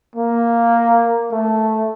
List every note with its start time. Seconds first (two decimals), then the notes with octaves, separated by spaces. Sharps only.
0.16 A#3
1.32 A3